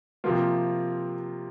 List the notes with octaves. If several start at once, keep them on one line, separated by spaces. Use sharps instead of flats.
C3 F3 A#3 F4